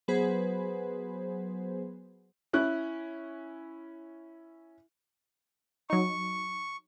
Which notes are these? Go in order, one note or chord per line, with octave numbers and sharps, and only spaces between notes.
F#3 B3 G#4 B4 C5
C#4 E4 F#6
F#3 D#4 C#6